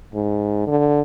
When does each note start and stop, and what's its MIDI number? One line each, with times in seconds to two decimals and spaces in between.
0.14 0.66 44
0.67 1.01 50